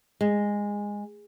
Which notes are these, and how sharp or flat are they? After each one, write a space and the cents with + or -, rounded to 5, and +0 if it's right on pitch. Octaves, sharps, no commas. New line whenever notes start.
G#3 -15